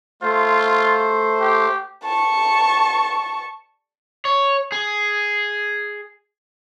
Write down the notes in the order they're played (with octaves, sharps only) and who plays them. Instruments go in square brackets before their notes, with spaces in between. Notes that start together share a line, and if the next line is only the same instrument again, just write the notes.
[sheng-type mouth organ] A3 C5 [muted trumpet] F4
[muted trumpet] G4
[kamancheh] A5 C#6
[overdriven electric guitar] C#5
G#4